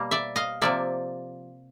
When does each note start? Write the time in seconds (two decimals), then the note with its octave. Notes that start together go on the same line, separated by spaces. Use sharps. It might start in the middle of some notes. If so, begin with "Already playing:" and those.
Already playing: B2 G3 A#3
0.11 D5 E5
0.36 D#5 F5
0.61 C3 F3 A#3 D5 E5